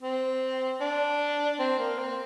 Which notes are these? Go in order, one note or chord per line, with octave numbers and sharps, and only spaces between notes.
C4
D4
C4
A#3
C4